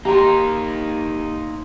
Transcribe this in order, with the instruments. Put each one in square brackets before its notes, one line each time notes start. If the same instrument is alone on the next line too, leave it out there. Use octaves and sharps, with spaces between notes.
[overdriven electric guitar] A#3 D#4 [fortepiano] G4 [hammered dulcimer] A#5 C6